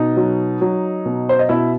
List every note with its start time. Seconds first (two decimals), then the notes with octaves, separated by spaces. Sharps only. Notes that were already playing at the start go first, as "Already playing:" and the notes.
Already playing: B2 D#4
0.17 F#3
0.61 F#3
1.06 B2
1.29 C5
1.39 D#5
1.49 B2 E4 E5